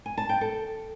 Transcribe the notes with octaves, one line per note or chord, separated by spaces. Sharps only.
G#5
A5
G5
A4